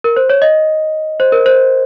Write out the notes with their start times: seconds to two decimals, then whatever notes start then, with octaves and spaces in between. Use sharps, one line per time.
0.04 A#4
0.16 C5
0.30 C#5
0.42 D#5
1.20 C5
1.32 A#4
1.46 C5